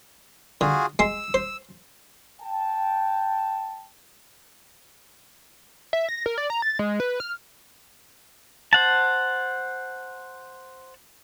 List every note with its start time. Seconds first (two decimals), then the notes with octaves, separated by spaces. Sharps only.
0.61 D3 F4 F#4 G#4
0.99 G#3 C6 E6
1.34 C5
2.41 G5 A5
5.93 E5
6.09 A#6
6.26 A#4
6.38 D5
6.50 A#5
6.62 A6
6.79 G#3
7.00 B4
7.20 F6
8.73 C5 F#5 A5